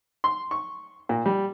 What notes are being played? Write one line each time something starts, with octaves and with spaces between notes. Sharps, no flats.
C6
C#6
A#2
G3